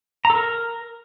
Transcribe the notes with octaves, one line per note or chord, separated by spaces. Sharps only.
A#5
A4
A#4